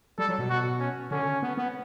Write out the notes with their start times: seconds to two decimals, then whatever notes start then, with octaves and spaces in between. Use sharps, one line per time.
0.19 G3 A4
0.29 F#3
0.39 B2
0.50 F#4
0.80 C#4
1.11 D3 C#4
1.43 B3
1.57 B3